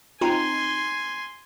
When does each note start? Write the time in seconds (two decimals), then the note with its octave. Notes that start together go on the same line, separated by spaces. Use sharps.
0.21 C4 D#4 F4 G#5 C6